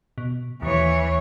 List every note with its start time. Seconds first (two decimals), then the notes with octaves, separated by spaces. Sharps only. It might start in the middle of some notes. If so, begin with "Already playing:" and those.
0.18 B2
0.62 D#2 E3 C#5